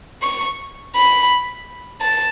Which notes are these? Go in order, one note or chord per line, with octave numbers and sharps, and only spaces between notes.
C#6
B5
A5